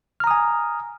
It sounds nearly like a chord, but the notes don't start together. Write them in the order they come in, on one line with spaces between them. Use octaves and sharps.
F6 A#5 D#6 G#5